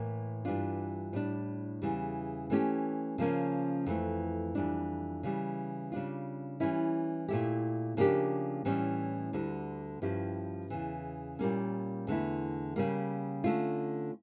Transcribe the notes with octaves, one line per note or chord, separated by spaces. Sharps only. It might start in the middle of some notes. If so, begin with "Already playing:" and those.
Already playing: A2 E3 A#3
G2 E3 G3 D4 F4
A2 G3 D4
E2 C#3 E3 G3
E3 A3 C#4 G4
C#3 F3 A#3 C#4
F2 E3 A3
F2 E3 G3 D4
C#3 E3 G3
C#3 G3 D4 F4
E3 G3 C#4 E4
A#2 A3 E4 G4
C#3 F3 A#3 D4 G4
A2 E3 G3 C#4
D2 D3 G3
G2 F3 C#4 E4 G4
E2 C#3 E3
A#2 G3 A#3 C#4
E2 D3 A3 E4
C#3 G3 A#3
D3 A3 C#4 F4